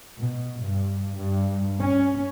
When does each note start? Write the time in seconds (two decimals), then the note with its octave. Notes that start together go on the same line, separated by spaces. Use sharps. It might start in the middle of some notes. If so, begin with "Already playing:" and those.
0.18 B2
0.62 G2
1.17 G2
1.78 C#4